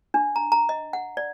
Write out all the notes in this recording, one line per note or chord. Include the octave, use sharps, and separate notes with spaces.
D4
A#5
A#5
D#5
F#5
D5